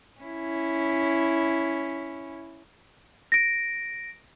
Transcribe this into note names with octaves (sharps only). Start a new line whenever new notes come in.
C#4 E4
A#6 D7